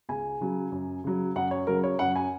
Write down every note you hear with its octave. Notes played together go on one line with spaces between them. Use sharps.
C#2 G#5
C#3 F#3
F#2
C#3 F#3
F#2 F#5
C#5
C#3 F#3 A#4
C#5
F#2 F#5
G#5